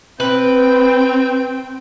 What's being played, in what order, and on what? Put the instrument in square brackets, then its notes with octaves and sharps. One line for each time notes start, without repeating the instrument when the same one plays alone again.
[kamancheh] C4 G5 [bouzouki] B4